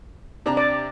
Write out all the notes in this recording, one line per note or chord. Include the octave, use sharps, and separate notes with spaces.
C3 D4 A#5
D5